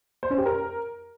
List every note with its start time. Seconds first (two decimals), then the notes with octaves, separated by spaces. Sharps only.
0.23 C5
0.30 C#4
0.38 G4
0.46 A#4